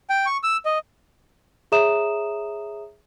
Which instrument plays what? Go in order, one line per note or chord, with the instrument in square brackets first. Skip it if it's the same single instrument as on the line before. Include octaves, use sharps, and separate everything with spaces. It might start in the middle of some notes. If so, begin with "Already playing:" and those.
[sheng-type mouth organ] G5
C#6
E6
D#5
[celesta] G#4 C#5 E5 A#5 D#6 E7